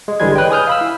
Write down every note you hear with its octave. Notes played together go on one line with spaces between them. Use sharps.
G#3
G#1 D3 E3 G3 G#3 G#6
B4 C#5 D#5 G5
G#5 D#6 F6 G6
F5 B5 E6
E4